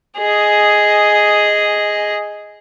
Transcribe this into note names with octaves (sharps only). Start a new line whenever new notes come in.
G#4 D#5